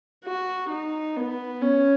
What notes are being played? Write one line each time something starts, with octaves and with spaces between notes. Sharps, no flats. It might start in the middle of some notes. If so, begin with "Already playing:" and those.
F#4
D#4
B3
C#4